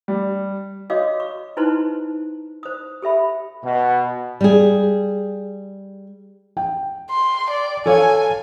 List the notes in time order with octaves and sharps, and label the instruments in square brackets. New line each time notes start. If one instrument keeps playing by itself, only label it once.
[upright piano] G3
[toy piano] F#4 C#5 D#5 F5 D6 D#6
C#6
D#4 E4 B4 C5 A5 C6
C5 D#6
G4 A4 E5 B5
[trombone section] B2
[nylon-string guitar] G3 G#4
[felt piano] G5
[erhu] C6
D5
[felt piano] A4 C#5 F5 [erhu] G#5